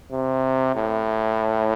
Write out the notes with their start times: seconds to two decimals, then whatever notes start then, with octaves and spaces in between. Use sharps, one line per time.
0.11 C3
0.76 A2